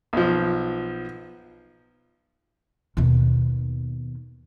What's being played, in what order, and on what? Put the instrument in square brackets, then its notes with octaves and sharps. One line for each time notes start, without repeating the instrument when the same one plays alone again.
[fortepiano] B1 F3
[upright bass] D#2 B2